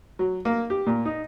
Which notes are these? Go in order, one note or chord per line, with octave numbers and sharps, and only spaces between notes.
F#3
A#3
G4
A#2
D#4